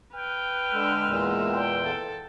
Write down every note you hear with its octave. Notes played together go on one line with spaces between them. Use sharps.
B4 G5 F6
D3 G#3 E6
E2 A#2
G5
A4